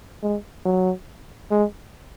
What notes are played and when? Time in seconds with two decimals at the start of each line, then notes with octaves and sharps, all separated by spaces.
0.23 G#3
0.65 F#3
1.51 G#3